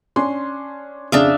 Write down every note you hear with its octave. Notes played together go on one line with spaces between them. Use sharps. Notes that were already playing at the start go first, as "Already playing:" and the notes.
C#4 D4 C6
F2 C#3 D4 E5 F5 D#6